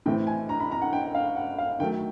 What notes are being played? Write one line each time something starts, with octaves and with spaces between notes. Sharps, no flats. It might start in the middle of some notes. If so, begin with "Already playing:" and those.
A2 E3 A3 C4 G5
G#5
A#5
B5
A#5
F#5
G5
F5
F#5
F5
D#3 F#3 A3 G5